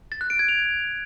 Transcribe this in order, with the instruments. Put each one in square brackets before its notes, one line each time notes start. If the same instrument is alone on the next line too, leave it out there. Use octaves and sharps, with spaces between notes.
[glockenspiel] A6
F#6
D7
G#6
F7